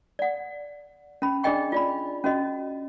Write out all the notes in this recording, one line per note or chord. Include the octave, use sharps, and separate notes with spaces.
D5 F#5
C#4 B5
D4 G#4 D5 D#5 G5 C#6
F4 D5 B5
C#4 F#4 D#5